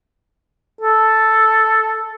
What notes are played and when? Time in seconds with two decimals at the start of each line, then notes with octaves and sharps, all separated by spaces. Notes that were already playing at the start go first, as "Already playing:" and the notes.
0.81 A4